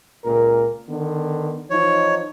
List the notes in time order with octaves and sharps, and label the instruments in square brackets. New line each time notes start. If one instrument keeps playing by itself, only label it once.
[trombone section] C#2 A#2 A#4
D3 D#3 B3
[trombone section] E3 F3 D#4 [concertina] C#5